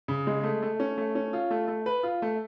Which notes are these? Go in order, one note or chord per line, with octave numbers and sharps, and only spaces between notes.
C#3
G#3
A3
A3
C#4
A3
C#4
F4
A3
A3
B4
F4
A3